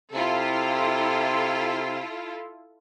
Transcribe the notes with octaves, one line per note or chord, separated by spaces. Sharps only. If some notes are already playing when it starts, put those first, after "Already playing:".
C3 E4 F4 A4